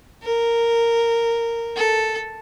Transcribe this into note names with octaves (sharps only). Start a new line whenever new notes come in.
A#4
A4